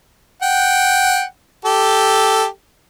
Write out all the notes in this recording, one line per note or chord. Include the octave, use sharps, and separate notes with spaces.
F#5 G5
G4 A4